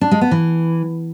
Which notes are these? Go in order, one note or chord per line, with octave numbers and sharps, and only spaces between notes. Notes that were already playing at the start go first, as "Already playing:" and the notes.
D4
G#3
B3
E3